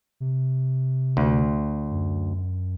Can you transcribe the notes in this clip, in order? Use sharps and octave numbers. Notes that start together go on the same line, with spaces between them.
C3
D2
F#2